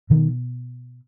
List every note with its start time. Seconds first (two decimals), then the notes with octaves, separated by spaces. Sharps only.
0.10 B2 D#3